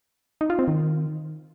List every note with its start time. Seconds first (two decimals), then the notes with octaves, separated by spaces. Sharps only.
0.41 D#4
0.50 F4
0.59 C4
0.68 D#3